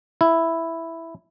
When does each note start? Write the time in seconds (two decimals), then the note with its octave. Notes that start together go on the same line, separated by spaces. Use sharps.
0.21 E4